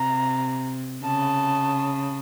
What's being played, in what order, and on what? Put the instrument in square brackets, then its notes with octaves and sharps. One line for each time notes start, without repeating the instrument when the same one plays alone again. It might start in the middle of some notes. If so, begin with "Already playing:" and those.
Already playing: [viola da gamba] C3 [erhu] A#5
[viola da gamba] C#3 [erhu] A5